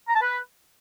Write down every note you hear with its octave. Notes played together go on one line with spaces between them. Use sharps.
A#5
A5
B4